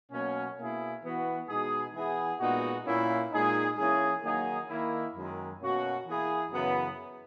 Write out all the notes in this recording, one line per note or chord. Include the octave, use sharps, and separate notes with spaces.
B2 F#3 A#3 C#4
B2 A#3 E4 G#4
E3 B3 F#4
B2 G#3 D#4 G#4
E3 B3 E4 G#4
A#2 G#3 B3 D#4 F#4
A#2 A#3 C#4 E4
A#2 G#3 D#4 G#4
E3 A#3 C#4 G#4
D#3 F#3 A#3 D#4 G#4
D#3 A#3 E4
F#2 D#3 G#3
B2 A#3 C#4 F#4
E3 A#3 E4 G#4
F#2 C#3 E3 B3